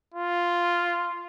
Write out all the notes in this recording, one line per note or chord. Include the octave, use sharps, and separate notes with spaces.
F4